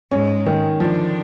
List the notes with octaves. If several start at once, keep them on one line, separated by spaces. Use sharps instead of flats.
G#2 G#3 C#4
D#3
D3 F3 D4